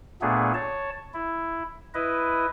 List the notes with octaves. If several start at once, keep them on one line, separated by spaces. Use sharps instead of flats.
A#2 A3 B3 D4 G#4
C#5 A5
E4
E4 B4 D#5